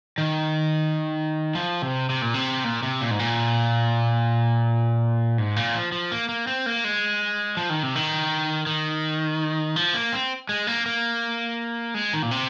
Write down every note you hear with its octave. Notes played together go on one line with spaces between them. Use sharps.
D#3
F3
C3
C3
A#2
C3
A#2
C3
A#2
G#2
A#2
G#2
A#2
F3
F3
A#3
A#3
C4
A#3
G#3
F3
D#3
C3
D#3
D#3
F3
A#3
C4
G#3
A#3
A#3
G#3
D#3
A#2
C3